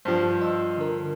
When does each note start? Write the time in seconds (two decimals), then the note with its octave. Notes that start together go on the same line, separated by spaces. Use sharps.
0.05 G2 F3 C5
0.41 D#5 E6
0.78 D3 A#4